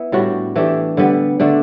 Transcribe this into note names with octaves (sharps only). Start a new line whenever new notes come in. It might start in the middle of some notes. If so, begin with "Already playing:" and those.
Already playing: B3 E4 B4
A2 G3 D4 F#4
E3 A3 D4 G4
D3 G3 B3
D3 A3 D4